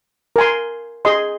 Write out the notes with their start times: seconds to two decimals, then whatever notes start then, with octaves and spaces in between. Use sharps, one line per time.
0.36 A#4 G#5 C6
1.05 G#4 D#5 C6